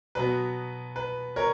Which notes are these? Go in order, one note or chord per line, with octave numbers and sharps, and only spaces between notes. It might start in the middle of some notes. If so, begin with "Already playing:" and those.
B2 F#3 B3 B4
B4
A#4 C#5